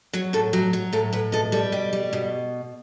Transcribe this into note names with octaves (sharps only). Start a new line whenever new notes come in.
F#3 C#5
A2 A4
F#3 G4
F#3
A2 A4
A2 B4
B2 A4
G3 A4
B2 G4
G3
B2